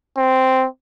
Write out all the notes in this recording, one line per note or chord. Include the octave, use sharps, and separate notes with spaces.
C4